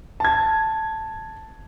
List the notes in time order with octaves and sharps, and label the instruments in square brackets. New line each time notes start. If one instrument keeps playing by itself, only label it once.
[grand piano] A5 G#6